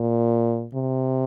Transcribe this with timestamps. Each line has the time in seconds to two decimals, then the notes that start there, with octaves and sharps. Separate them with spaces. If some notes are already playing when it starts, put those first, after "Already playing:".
Already playing: A#2
0.75 C3